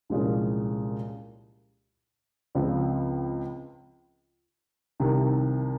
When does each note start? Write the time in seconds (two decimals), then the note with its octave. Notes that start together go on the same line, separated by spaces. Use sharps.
0.10 C2 A#2 F3 G#3 C#4
2.55 C#2 C#3 F3 C4
5.00 C2 C3 D#3